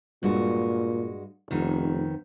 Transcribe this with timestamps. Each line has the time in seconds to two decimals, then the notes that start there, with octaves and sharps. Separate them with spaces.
0.23 G2 A#2 G#3 F#4
1.51 F1 F2 D#3 B3